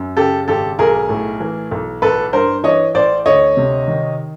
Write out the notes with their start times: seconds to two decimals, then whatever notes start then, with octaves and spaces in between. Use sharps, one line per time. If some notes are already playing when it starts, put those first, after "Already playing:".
Already playing: F#2
0.16 C#3 G4 A4
0.48 G#1 G4 A4
0.79 B1 G#4 A#4
1.09 A2
1.40 E3
1.71 B1
2.02 A1 A4 B4
2.33 G2 A#4 C5
2.64 E3 C#5 D#5
2.94 A1 C5 D5
3.26 D2 C#5 D#5
3.57 C3
3.88 D#3